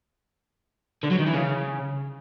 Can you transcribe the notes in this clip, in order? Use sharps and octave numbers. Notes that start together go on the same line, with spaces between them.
D3
F#3
D#3
E3
C#3